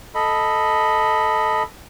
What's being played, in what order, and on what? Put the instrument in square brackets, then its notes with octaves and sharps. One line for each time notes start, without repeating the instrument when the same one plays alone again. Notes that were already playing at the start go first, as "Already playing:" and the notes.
[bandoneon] A4 D#5 B5